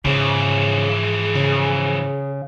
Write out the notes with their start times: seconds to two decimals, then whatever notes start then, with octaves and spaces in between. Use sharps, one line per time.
0.05 G#2 C#3 E3 F3 G#4
1.35 C#3